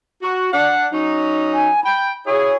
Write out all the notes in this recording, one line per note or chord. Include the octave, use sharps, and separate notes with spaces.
F#4
D4 F#5
F#3 C#4 D#4
G#5
G5 B5
E4 F#4 G#4 C#5